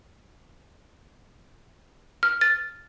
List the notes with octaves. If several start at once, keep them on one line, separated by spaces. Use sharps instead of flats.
F6
A6